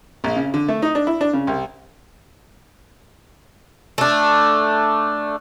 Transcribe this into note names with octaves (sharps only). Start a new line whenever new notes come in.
A#1
C#3
D3
A3
D#4
D4
E4
D4
C#3
C2
A3 D4